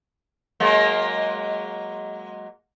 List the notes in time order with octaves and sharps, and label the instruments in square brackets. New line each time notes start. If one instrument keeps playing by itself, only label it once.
[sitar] F#3 G#3 A#3